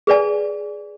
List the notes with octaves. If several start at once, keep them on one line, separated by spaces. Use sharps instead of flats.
G#4 B4 D5 G#5